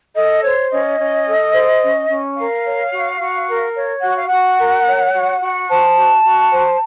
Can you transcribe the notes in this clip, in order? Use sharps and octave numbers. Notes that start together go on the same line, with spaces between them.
A4 D#5
C5 C#5
C#4 D#5
C#4
A4
C5
C#4
C#4
A#4 F5
C#5
F#4
F#4
A#4
C#5
F#4 F#5
F5
F#4 F#5
A#4
C#5
F#4
F#4
C5 A5
F#4
F#4
C5